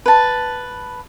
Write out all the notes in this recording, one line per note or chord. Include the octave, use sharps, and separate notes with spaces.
B4 A5